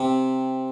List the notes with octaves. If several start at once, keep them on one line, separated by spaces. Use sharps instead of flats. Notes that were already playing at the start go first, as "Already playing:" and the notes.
Already playing: C3